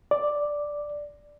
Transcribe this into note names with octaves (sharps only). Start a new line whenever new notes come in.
D5